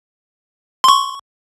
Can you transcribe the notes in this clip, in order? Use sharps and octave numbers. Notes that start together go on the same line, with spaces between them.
C6 C#6